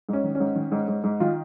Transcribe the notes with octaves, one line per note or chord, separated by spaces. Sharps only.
G#2 C#4
D#3
G#2 C#4
D#3
G#2
G#2
G#2
D#3 F4